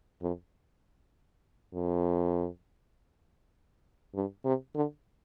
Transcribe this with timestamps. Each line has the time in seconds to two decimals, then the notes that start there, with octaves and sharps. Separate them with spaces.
0.22 F2
1.73 F2
4.15 G2
4.45 C3
4.75 D3